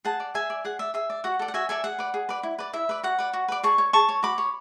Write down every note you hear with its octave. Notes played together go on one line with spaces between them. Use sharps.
G#4 F#5 A5
D5
G#4 E5 G#5
D5
G#4 F#5
D5 E5
G#4 E5
D5
F#4 F#5
A4 D5
F#5
F#4 E5 G#5
A4 D5 E5 G#5
G#4 F#5
B4 D5
G#4
B4 D5
E4
B4 D5
E4 E5
B4 D5
F#4 F#5
B4 D5
F#4
B4 D5
G#4 A5 C#6
C#5
G#4 A5 C#6
C#5
F#4 B5 D6
C#5